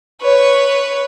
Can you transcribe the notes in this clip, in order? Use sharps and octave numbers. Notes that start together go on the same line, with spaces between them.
B4 C#5